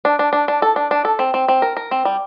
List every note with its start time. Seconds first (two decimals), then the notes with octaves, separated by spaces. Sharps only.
0.05 D4
0.19 D4
0.33 D4
0.48 D4
0.62 A4
0.76 D4
0.91 D4
1.05 A4
1.19 C4
1.34 C4
1.48 C4
1.62 A#4
1.77 A#4
1.91 C4
2.05 G3